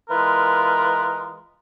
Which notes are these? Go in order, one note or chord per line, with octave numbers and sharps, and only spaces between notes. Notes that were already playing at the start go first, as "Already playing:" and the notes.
E3 G#3 F4 A#4 B4